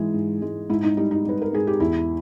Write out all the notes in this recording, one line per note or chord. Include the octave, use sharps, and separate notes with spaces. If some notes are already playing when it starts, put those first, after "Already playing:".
Already playing: G#2 E3 G#3 G#4
G#2
G#3
G#2 E4
D#4
G3 D#4
D#4
G3 B4
A#4
G#2 G#4
G4
E2 E4